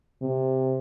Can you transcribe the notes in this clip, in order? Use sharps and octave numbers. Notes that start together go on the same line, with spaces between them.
C3